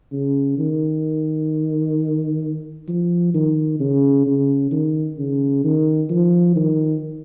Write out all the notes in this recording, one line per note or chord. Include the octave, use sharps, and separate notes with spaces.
C#3
D#3
F3
D#3
C#3
C#3
D#3
C#3
D#3
F3
D#3